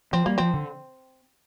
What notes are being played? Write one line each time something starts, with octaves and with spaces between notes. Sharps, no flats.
F3 C4
G3 A#3
F3 C4
D3